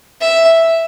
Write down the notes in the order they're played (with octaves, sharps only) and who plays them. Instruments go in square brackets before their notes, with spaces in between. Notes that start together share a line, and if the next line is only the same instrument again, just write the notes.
[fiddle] E5